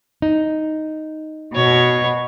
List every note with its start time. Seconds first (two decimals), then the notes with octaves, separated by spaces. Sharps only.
0.22 D#4
1.55 B2 C#5